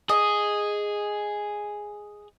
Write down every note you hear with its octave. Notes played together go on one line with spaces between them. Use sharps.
G#4 D#5